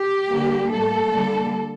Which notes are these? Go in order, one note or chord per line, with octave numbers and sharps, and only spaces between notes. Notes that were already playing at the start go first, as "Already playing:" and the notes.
Already playing: G4
D3 G3 A#3
A2 G3 A#3 A4
D3 G3 A#3